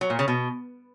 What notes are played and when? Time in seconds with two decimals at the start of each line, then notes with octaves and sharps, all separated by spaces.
0.01 F#3
0.10 A#2
0.19 C#3
0.28 B2